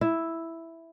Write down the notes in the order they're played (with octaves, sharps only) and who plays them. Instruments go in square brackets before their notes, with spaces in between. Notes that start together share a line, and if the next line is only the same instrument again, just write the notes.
[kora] E4